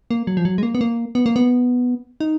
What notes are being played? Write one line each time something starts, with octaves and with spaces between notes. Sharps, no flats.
A#3
F#3
F3
F#3
G#3
A#3
B3
A#3
B3
A#3
B3
D#4